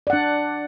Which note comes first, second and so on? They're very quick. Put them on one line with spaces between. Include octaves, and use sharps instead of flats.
D5 F#5 D4